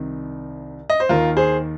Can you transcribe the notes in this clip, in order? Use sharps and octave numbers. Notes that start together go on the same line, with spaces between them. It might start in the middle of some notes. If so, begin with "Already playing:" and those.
Already playing: C2 C3 D#3
D#5
C5
D#2 D#3 F4 A#4
G#4 C5